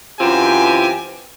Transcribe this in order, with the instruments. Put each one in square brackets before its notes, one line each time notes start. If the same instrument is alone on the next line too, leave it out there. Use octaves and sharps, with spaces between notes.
[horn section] F#2 E3 C4 F4 G4 G#5